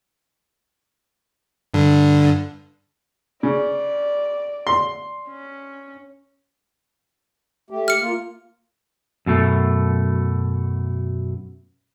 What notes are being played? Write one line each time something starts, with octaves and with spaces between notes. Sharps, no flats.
G2 D3
C#3 D5
C6
C#4
A3 G4
F6 C#7
A#3 F4
F#2 B2 A3